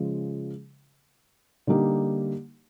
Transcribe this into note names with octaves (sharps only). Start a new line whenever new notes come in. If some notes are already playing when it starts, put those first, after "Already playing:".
Already playing: C#3 F3 G#3
D3 G3 A#3 D#4 G4